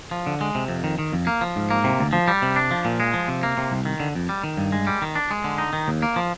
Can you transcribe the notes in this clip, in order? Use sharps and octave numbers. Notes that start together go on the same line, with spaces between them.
F3
D3
G#3
C3
F2
D#3
D#3
F2
A#3
F3
G#2
A#3
C3
D2
F3
G3
C3
D4
F3
A#2
G#3
F3
C3
A#3
C3
C2
D#3
D3
F2
G3
D#3
G2
G#3
G3
D#3
D4
G#3
D3
D#4
D#3
D#2
A#3
F3